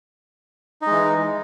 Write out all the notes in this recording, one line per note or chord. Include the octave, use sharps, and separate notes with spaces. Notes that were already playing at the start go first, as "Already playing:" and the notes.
E3 G#3 D#4